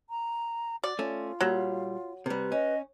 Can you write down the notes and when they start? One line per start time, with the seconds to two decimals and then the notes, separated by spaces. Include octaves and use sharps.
0.10 A#5
0.84 F#4 D5
0.99 A3 C#4 F4
1.41 A#2 F#3 G3
2.26 C3 G3 B4
2.52 C#4 D#5